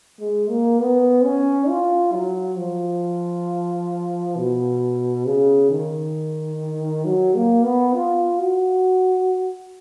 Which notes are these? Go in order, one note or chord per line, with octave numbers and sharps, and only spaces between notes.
G#3
A#3
B3
C#4
F4
F#3
F3
B2
C#3
D#3
F#3
A#3
B3
F4
F#4